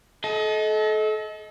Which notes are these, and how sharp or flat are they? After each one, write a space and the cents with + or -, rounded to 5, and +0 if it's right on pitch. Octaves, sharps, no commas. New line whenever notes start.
A4 -30 D#5 +25